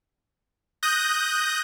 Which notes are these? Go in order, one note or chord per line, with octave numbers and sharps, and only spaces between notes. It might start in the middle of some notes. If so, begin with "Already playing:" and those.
D#6 F#6 G6 A#6